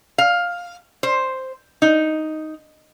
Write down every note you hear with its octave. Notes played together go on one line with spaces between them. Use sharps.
F5
C5
D#4